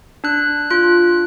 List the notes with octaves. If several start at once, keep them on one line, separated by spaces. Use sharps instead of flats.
D4 F#6
F4 F#6